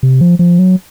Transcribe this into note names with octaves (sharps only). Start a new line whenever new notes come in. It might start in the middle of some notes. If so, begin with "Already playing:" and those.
C3
F3
F3
F#3